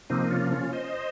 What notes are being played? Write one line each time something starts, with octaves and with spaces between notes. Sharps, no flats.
C3 F3 A#3 C4 D#4
C#4 F4
C#4 F4
C5 D#5